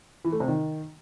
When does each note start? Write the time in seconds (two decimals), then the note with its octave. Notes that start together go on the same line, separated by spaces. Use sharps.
0.25 E3
0.32 A3
0.40 C3
0.48 D#3